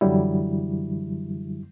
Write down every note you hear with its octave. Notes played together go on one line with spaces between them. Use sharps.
F#2 D3 E3 F#3 G3 E4